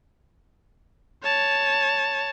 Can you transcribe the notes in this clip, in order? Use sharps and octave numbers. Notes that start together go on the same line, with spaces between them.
C#5 A5